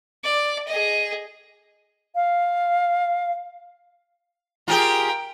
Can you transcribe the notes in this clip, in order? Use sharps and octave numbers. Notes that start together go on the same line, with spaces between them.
D5
G#4 D#5
F5
F4 G4 G#4 A#4 G5